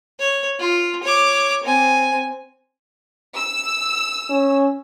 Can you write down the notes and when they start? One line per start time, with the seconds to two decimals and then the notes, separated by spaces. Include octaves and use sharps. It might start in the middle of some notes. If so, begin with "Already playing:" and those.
0.20 C#5
0.59 F4
1.03 C#5 D6
1.63 C4 G#5
3.36 E6
4.30 C#4